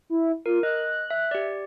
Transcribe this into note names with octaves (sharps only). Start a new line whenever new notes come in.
E4
F4 A#4
D#5 F#6
E5
G4 D5